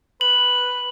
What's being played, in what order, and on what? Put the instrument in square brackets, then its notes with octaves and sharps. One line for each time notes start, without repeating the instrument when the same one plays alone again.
[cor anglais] B4 [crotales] F#7